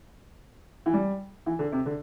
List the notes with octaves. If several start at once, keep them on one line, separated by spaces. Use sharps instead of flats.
E3
G3
E3
D3
C3
D3